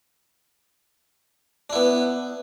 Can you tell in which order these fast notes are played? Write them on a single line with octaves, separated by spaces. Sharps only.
D4 E4 B3